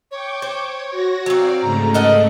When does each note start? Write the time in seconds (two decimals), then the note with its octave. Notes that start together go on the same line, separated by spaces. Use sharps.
0.11 C#5 G5 C#6 D6
0.42 C5
0.91 F#4 A#6
1.26 F#3 C4 D5 F5
1.61 G#2 C#3 A3 A#5
1.94 A4 A#4 D#5 F#5